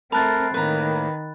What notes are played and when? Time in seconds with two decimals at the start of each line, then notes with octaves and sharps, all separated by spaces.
0.12 A3 C4 A#4 A5 B5 F#6 A6
0.54 A2 D#3 A#3 B4 A#5